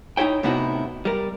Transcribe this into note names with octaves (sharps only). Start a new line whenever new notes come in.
D#4 E4 G4 C#5 G5
A2 C3 B3 D#4 E4 F#4
G3 A#4